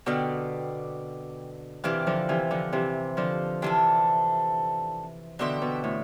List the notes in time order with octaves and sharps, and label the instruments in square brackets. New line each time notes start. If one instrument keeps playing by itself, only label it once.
[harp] B2 D3 [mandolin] C4 G4 D5 F5
[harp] C3 E3 [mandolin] E4 G4 D5 F5
[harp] D3 F3
C3 E3
D3 F3
C3 E3
D3 F3
[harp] C3 E3 [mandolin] D4 F4 A4
[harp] B2 D3 [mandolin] D4 G4 C5 E5
[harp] B2
A2